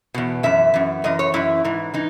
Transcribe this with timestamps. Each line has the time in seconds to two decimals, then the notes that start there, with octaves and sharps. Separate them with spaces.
0.14 E2 B2
0.43 F#2 E3 E5
0.74 F#2 E3
1.04 F#2 E3 D#5
1.19 C#5
1.34 F#2 E3 E4
1.64 G#2 E3
1.94 E3 D#4